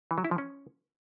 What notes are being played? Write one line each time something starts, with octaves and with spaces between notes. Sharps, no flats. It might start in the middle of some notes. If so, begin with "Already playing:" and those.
E3
F#3
E4
F3
C#4